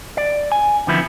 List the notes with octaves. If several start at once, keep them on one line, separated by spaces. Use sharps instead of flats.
D5
G#5
F2 D3 D#3 F3 B3 E4